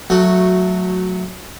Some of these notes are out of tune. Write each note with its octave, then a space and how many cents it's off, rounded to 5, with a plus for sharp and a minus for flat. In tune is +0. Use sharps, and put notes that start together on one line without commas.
F#3 -10 A3 +0 F#4 +0